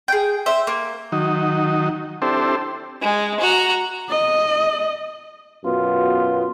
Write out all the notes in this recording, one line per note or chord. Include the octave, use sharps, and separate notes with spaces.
G#4 G5
C5 E5
A#3
D#3 F#3 D#4
C4 D4 E4 G4 A4 C5
G#3
F#4 A#5
D#5
F#2 B2 B3 F4